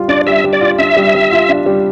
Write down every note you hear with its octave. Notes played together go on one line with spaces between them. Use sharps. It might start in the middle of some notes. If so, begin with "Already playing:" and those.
Already playing: G3 F4
D4 D5
G3 E5
G3
D5
F4
D4 E5
G3
G3
F4
D4
G3